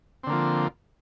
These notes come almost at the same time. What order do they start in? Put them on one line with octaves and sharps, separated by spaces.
C4 D3 A#3 F3